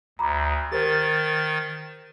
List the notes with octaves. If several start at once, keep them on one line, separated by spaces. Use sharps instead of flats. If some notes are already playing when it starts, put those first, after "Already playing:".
D2 A#5 B5 D6
D#3 G4 A#4 C5 A6